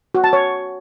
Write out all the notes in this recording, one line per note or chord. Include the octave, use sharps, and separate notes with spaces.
F#4
A5
C#5